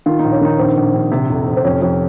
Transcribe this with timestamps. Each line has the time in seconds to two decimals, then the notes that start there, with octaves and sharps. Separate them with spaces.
0.06 D#3 F4
0.19 A#1 D#4
0.32 C#4
0.41 D#3 D#4
0.59 A#1 C4
0.77 A#1
0.94 A#1
1.12 C3
1.29 F1
1.47 F1
1.57 C4
1.64 F2 C#4
1.82 F2